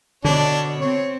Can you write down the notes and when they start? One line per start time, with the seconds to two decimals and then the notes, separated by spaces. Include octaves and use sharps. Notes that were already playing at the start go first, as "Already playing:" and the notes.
0.24 B2 D3 D4 C#5
0.81 C4 C#5